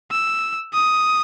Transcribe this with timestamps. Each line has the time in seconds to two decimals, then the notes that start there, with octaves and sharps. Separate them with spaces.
0.11 E6
0.74 D#6